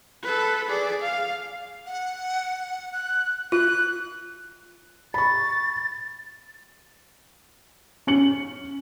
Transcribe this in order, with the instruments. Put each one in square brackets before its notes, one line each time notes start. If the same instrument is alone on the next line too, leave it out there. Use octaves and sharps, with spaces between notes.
[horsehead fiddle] A4 B4
G#4 D5
F5
[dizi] F#5
F#6
[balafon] F4 [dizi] F#6
[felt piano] B5 C#6 [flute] A6
[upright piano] C#4 C#7 F#7